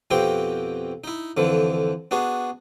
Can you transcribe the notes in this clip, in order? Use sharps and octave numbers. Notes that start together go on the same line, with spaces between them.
F2 B2 C4 G4 F5 G5
D#4 E4
F2 D3 E3 F3
B3 D4 F#4 G#4